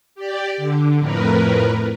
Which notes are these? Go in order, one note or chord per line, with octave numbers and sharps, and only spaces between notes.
G4 D5
D3
F2 A2 A#4 B4